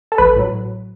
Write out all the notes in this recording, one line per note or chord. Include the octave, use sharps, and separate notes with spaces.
A4
A1 B4
A2 F#3